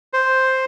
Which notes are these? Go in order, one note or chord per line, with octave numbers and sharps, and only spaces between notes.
C5